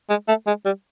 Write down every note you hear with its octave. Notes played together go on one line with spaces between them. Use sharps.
G#3
A3
G#3
G3